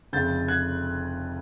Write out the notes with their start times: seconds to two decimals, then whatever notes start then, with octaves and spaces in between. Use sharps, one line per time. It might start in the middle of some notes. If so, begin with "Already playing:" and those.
0.13 F1 F2 C#3 G6 A6
0.48 F#6 G#6